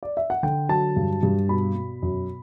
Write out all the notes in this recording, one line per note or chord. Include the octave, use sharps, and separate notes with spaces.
D5
E5
F#5
D3 G5
F#3 A5
G2
G2
B2 B5
B2
F#2